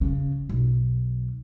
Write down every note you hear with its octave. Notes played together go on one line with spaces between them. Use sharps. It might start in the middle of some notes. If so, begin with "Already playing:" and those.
C#3
B1